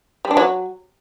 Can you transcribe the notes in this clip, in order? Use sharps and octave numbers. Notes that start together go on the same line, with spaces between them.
G3
D4
F#3